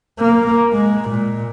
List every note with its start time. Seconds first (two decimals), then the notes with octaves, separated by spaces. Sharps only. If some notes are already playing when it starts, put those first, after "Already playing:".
0.19 A#3
0.73 G#3
1.10 A#2